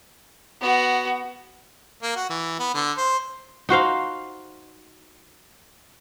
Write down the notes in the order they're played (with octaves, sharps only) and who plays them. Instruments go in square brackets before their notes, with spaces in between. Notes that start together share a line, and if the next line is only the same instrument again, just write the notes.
[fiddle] B3 F#4
[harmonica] A#3
F#4
E3
B3
D3
C5
[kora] D#4 F#4 C5 F5